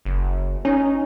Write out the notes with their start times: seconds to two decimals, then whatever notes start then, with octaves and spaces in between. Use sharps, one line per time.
0.05 F#1
0.65 C#4 D#4